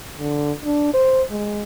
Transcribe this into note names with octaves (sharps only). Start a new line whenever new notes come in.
D3
D4
C5
G#3